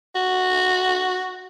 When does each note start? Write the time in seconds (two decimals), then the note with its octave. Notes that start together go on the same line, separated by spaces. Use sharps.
0.15 F#4